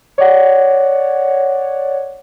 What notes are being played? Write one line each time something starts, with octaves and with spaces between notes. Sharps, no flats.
C#5 D5 F#5